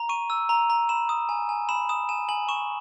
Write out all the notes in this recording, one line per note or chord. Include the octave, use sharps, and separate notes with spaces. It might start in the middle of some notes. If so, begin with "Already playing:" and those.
Already playing: A#5
C#6 D#7
E6
A#5
A#5
B5 E7
D#6
G#5
G#5
B5 E7
D#6 E7
G#5 E7
G#5 F#7
C#6 E7